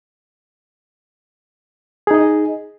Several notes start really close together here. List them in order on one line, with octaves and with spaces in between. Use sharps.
G#4 D#4 D#5